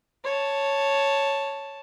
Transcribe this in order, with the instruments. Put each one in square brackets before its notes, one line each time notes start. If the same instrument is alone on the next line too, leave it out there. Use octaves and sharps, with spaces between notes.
[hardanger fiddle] C#5 A5